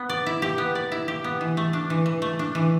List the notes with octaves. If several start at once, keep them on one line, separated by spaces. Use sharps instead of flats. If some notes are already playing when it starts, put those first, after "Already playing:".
Already playing: B3
D5
E4
G4
B3
D5
E4
G4
B3
E3
A3
D4
E3
E3
A3
D4
E3